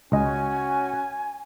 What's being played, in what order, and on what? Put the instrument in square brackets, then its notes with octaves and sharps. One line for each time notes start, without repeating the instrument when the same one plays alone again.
[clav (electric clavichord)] C#2 D#5 [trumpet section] C#4 F#4 [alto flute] G#5